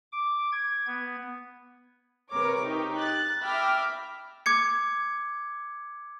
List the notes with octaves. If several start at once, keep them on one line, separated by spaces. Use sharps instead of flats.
D6
G#6
B3
C3 A#4 B4 C#5 D6
D#4 G4
F#6 A6
E5 G5 B5 D6 F6 A#6
D6 G#6 C#7